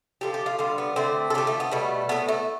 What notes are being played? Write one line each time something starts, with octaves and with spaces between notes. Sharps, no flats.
D3 F3 A3 G4
G4
F4
D3 G3 F4
B3
D3 A3 C4
A4
D3 F3 A3 G4
A3
B3
B2 G3 A3
A2 F3 A3 B3
A3